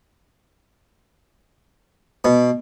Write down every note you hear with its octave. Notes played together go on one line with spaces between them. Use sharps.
B2